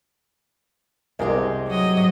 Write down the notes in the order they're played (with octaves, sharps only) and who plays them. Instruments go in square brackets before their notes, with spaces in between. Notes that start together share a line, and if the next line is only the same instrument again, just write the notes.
[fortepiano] C2 G#4 A#4 [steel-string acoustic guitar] G#3 C4 G4
[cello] F#3 D#5